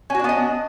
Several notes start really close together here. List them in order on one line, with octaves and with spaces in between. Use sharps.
C#4 F#4 D4 B3 D#5